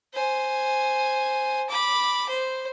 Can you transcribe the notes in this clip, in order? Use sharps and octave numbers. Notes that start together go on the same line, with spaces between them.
C5 G#5
B5 D6
C5